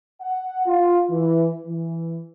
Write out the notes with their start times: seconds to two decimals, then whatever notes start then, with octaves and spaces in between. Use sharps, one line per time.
0.21 F#5
0.66 F4
1.10 E3
1.66 E3